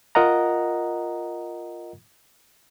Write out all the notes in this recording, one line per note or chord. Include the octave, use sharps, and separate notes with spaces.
F4 A#4 D#5 F#5 A#5